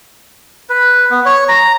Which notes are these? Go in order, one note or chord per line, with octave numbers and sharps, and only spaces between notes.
B4
B3
C#5
A#5